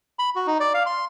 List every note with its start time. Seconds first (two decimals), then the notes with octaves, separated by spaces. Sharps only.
0.19 B5
0.36 F#4
0.47 D#4
0.60 D5
0.74 F5
0.86 C6